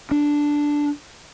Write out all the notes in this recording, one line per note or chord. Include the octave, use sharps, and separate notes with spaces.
D4